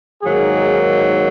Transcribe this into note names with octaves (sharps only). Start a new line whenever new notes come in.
G#2 D#3 F#3 A#3 G#4